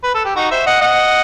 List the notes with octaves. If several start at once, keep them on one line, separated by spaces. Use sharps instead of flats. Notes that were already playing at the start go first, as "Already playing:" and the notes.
B4
A4
G4
D#4 F#4
C5 E5
D#5 F#5
D#5 F#5